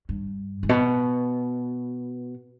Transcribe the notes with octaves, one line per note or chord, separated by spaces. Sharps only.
G2
G#2
B2